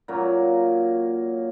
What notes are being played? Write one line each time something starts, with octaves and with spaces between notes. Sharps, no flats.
A#2 F#3 A#3 C#4